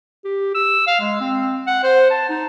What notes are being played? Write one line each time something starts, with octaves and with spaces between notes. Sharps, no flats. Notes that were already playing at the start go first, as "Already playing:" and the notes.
G4
E6
F5
G#3
C4
F#5
C5
A5
D#4